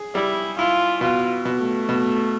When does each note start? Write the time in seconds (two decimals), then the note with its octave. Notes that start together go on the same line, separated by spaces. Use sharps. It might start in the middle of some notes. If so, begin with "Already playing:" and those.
Already playing: G#4
0.15 G3 E4
0.58 E4 F4
1.01 B2 F4
1.45 B2
1.59 A3
1.89 B2